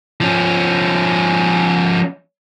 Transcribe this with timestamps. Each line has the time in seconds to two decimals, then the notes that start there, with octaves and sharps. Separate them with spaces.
0.21 F3 C#4